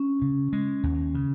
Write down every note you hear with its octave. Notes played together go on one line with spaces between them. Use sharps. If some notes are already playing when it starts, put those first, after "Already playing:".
Already playing: C#4
C#3
G#3
D#2
C#3